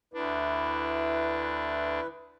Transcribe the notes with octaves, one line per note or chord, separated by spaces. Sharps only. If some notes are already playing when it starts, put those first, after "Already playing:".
D2 D4 E4 B4